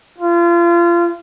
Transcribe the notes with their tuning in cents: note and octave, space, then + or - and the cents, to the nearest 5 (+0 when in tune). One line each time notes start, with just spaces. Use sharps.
F4 -30